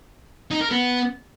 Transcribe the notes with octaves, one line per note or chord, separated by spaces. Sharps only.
D#4
A#4
B3